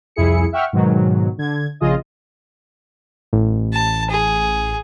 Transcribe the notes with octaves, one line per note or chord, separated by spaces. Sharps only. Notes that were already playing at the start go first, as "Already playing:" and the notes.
C2 F2 E4 G#4 C#7
E5 F#5 G5 C#6 F6
G#2 B2 D#3 F#3
D3 G#6
A#1 C#3 F4 G#4 D#5
A1
A5
G#4